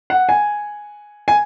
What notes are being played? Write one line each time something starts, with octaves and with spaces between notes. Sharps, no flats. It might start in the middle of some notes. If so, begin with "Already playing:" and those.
F#5
G#5
G#5